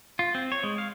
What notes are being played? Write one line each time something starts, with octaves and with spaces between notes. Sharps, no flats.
F4
C4
C#5
G#3
F5